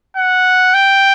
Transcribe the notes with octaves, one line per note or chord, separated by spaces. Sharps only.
F#5
G5